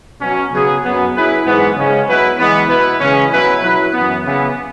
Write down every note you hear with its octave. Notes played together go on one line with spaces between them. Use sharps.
B2 F#3 C#4
C#3 F#3 B3 G#4
F#2 F#3 B3
F#3 E4 G#4 B4
G#2 E3 B3 G#4 B4
C#3 G#3 C#4
F#3 B3 E4 B4
E3 G#3 B3
B2 B3 E4 B4
C#3 E3 G#3 C#4
B2 F#3 E4 B4
F#3 E4 B4
F#2 E3 B3
C#3 E3 B3